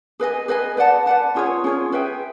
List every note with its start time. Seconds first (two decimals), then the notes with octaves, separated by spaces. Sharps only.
0.20 G#4 B4 D#5 G#5
0.48 G#4 B4 D#5 G#5
0.77 B4 D5 F#5 A5
1.06 B4 D5 F#5 A5
1.35 C#4 F4 G#4 C#5
1.64 C#4 F4 G#4 C#5
1.92 G#4 B4 E5 G5